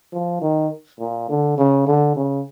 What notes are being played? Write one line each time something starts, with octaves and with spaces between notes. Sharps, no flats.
F3
D#3
A#2
D3
C#3
D3
C#3